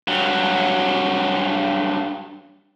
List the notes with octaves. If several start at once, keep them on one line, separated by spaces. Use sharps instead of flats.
G2 F#3